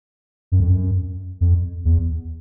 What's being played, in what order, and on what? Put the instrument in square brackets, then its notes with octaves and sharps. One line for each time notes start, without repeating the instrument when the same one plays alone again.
[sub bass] F#2
F2
F#2
F2
E2